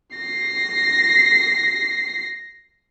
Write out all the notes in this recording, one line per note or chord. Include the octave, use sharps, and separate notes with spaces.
A#6 C7